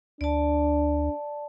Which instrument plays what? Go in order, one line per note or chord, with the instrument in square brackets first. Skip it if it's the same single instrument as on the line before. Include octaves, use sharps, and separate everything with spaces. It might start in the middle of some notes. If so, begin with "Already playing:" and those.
[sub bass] D2 [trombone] D4 [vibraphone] D5 A5